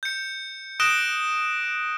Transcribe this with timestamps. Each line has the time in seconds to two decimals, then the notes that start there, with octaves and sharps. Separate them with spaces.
0.03 G6 C#7
0.80 D#6 F#6 A#6 D7 E7 G7